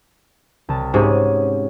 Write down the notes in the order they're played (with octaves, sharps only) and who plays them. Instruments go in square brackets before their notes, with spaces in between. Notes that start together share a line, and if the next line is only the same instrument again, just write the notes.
[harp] C2 A5
[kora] G#2 C3 [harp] C#4 F#4 G#4